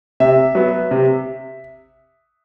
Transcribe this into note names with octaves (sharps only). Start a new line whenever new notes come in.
C3 E5
F#3 B3
C3